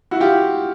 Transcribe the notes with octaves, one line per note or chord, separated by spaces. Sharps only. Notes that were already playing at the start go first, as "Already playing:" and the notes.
E4 F#4
F4 G4